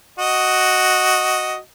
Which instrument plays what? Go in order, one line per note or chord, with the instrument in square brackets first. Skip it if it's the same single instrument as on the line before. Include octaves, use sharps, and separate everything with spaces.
[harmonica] F#4 D#5